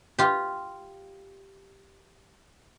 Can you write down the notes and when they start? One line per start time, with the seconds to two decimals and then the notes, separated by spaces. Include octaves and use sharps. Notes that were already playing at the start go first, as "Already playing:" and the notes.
0.19 F4 G4